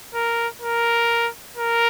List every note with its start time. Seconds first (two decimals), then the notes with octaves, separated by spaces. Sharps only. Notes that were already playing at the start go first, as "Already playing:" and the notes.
0.14 A#4
0.62 A#4
1.57 A#4